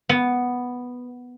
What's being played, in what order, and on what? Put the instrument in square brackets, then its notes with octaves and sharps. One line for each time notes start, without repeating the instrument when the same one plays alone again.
[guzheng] B3